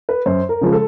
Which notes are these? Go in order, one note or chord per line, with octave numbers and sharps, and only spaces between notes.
B4
F#2 C5
A#4
C#3 F3 G#3
A4